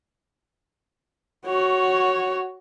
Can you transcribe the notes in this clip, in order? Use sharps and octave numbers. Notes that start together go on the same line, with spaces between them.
F#4 C#5